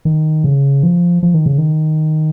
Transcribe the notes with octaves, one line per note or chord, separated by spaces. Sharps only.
D#3
C#3
F3
F3
D#3
C#3
D#3